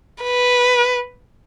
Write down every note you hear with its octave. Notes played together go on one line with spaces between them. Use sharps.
B4